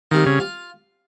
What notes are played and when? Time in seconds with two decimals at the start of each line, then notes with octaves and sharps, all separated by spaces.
0.11 D#3 G3 C4 F4
0.26 C#3
0.40 F4